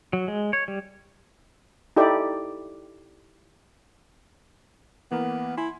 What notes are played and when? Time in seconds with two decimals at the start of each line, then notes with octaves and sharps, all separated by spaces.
0.13 F#3
0.28 G#3
0.53 C#5
0.68 G3
1.97 D#4 E4 G4 A4 D5
5.11 E3 A#3 B3 A#4
5.57 E4 G#5 C6